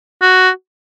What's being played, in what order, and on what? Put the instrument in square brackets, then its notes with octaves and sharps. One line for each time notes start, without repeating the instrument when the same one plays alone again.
[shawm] F#4